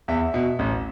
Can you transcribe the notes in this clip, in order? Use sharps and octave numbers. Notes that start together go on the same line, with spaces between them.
E2 E5
B2
A1